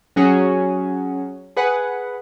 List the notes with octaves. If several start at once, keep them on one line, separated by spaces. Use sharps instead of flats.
F#3 C#4 F#4 G#4
G#4 B4 F#5